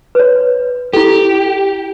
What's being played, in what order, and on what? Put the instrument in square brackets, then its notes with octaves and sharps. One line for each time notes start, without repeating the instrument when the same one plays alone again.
[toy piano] B4 C#5
[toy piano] E4 A4 [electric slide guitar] G4